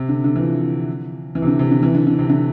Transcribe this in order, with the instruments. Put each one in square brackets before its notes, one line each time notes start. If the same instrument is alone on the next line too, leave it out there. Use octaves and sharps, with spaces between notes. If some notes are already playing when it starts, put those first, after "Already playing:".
Already playing: [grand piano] C3
D3
D3
E3
F3
E3
C3
D3
C3
D3
E3
D3
D3
C3
D3